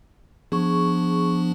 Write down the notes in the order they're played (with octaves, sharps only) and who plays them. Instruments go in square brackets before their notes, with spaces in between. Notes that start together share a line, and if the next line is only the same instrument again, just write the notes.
[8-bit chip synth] F3 B3 D4 [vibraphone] G#4 C#6